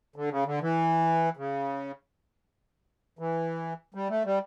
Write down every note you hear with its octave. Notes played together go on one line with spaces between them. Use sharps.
D3
C#3
D3
E3
C#3
E3
G3
A3
G3